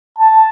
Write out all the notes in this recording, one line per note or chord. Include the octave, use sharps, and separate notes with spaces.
A5